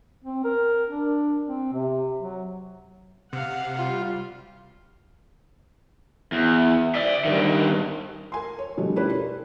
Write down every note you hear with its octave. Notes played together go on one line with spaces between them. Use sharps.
C4
A#4
D4
C4
C3
F#3
C3 F5 F#5
G3 F4
E2
D5 E5
G2 D#3
A#4 G#5 C6
C#5
B2 D3 F3 G3 A3
C#4 E4 G4 B4 C5 D5
A#4